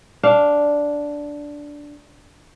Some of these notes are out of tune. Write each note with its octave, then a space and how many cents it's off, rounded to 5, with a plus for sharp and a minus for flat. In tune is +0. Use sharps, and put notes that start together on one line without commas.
D4 -5 F5 +0